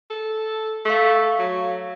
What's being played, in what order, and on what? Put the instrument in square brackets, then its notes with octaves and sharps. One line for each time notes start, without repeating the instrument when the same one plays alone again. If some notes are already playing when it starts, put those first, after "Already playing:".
[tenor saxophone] A4
[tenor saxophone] A3 [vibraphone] F5 C#6
[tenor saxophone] F#3